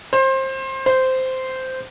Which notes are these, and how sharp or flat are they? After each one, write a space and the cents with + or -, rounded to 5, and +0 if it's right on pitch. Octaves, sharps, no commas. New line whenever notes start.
C5 +25
C5 -10